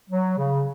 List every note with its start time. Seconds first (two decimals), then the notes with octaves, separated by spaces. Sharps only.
0.10 F#3
0.37 C#3